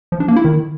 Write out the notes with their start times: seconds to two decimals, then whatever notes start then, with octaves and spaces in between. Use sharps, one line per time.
0.12 F3
0.20 D4
0.28 A#3
0.36 E4
0.45 D#3